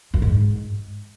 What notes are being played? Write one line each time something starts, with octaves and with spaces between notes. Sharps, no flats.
F#2
G#2